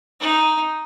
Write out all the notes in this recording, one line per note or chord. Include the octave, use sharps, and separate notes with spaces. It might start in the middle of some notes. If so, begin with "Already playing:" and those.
D#4